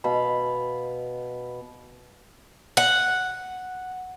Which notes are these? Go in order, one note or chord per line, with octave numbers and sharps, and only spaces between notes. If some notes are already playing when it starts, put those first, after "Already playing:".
B2 F5 B5
F#5